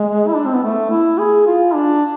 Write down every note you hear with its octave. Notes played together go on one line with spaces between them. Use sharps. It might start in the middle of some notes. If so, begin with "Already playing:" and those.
Already playing: G#3
E4
D4
C4
B3
A3
E4
G#4
F4
D4